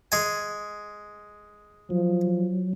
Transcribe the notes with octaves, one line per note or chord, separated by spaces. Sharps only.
G#3 G#5
F3 F#3